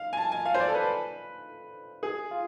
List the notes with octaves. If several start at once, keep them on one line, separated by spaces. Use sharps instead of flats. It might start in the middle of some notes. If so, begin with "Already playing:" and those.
Already playing: F5
G#5
A5
G#5
F5
C5
D5
A4
B4
G#4
F4